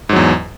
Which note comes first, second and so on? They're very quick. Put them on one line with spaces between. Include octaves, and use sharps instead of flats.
G#2 F#3 E2